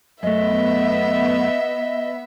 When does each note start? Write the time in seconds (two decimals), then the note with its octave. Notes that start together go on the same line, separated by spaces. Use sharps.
0.23 F#2 A3 B3 D#5 E5